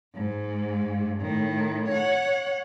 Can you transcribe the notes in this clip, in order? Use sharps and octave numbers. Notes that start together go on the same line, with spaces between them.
G#2
A2 D#3
C#5 F#5